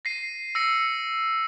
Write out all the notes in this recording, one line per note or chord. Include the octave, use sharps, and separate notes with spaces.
A#6 C7 D#7
E6 A#6 C#7